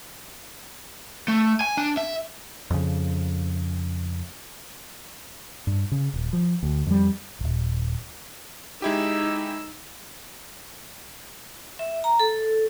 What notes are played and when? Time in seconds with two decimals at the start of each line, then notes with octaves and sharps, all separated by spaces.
1.28 A3
1.61 G#5
1.77 D4
1.97 E5
2.71 F2 C#3
5.67 G2
5.92 C#3
6.14 D#1
6.33 F3
6.63 D2
6.87 F2 G3
7.41 D#1 G#1
8.82 G#3 D#4 E4 G4 E6
11.79 E5
12.04 A#5
12.20 A4